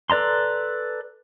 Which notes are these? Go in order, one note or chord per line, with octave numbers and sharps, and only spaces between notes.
A4 B4 D5 A#5 C6